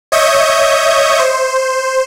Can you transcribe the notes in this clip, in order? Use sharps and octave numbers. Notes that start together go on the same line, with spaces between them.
C#5 D#5 E5 C#6 D#6 G6
C5